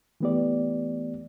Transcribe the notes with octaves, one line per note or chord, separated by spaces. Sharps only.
E3 A3 B3 G4 D5